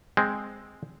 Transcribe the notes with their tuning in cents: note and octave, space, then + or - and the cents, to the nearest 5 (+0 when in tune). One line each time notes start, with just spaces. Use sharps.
G#3 +0 C4 +0